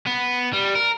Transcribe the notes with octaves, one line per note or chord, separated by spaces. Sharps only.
B3
G3
A#4